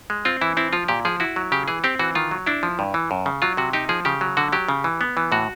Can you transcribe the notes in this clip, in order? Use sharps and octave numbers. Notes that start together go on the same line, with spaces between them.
G#3
C4 F4
E3 E4
C4 E4
F3 F4
A#2 G4
F3 G#4
E4 F#4
F#3
C#3 G4
E3 G#4
C4 G4
E3 F#4
D#3 F4
F#3
D4 E4
F3
G2
E3
F#2
C#3
F#3 F4
C3 F#4
D#4 G4
F3 G#4
C#3 G4
F#3
D3 F#4
F#3 G4
C#3
E3
B3
E3
A2 F#4